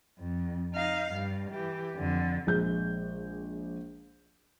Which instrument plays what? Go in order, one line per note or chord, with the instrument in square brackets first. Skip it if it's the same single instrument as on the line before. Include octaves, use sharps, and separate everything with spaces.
[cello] F2
D#4 F5
G2
E3 G4
F2 D3
[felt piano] A#1 G#3 G6